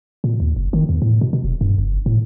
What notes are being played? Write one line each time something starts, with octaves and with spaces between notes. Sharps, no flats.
A#2
D#2
F#1
D#3
E2
A2
B2
B2
E1
G2
F#1
A2